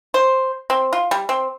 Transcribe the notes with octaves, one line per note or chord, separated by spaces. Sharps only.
C5
C4
F4
G3
C4